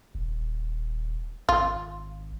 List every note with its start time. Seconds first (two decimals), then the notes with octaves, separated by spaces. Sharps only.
0.15 D#1
1.49 G#1 F4